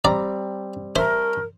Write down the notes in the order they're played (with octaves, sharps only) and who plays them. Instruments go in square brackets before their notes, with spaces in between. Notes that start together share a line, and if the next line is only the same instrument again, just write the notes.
[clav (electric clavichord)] G3 C4 [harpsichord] D5 [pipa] A#5
[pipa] A3 E5 [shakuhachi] A#4 [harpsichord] C5